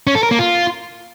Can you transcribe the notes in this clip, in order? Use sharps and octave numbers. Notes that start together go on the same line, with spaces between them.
C#4
A4
A#4
A#3
F4